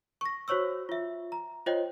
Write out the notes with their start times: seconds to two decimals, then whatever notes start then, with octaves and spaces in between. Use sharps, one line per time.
0.21 C#6 A#6
0.48 F#4 C5 C#5 C#6 E6
0.89 F4 E5
1.32 A#5
1.66 F4 C5 C#5 D#5 G5